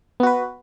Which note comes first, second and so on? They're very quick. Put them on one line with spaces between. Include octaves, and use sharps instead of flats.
B3 F#4 B4